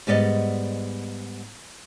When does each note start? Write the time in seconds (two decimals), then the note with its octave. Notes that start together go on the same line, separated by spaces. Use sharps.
0.07 G#2 G3 B3 D5 D#5